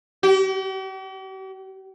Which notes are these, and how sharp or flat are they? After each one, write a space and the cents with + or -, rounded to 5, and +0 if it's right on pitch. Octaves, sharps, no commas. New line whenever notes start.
G4 -45